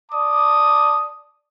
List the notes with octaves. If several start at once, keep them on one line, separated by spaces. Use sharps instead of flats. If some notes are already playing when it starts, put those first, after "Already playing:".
D5 A5 D6 D#6